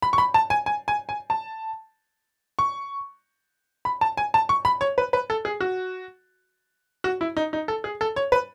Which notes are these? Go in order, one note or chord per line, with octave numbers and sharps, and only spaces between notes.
B5
C#6
B5
A5
G#5
G#5
G#5
G#5
A5
C#6
B5
A5
G#5
A5
C#6
B5
C#5
B4
B4
A4
G#4
F#4
F#4
E4
D#4
D#4
A4
G#4
A4
C#5
B4